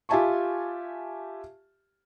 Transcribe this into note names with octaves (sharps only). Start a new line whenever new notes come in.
F4 G4 E5 G#5 A5 C#6